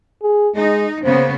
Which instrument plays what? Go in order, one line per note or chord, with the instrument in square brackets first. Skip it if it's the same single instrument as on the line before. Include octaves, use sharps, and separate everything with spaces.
[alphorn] G#4
[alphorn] G#3 [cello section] D#4
[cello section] C#3 A#3 B3 [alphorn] C5